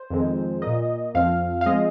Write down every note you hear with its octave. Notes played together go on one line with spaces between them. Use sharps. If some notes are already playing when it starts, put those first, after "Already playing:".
Already playing: C5
F2 D#3 G#3 C4
A#2 A#3 D#5
F2 F3 C4 F5
F5
F3 G#3 C4 D#5